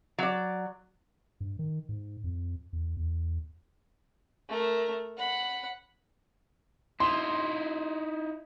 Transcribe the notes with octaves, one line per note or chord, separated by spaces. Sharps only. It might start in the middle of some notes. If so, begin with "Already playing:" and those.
F#3 D5
G2
D#3
G#2
F2
E2
E2
A3 A#4
F#5 B5
D#4 E4 C6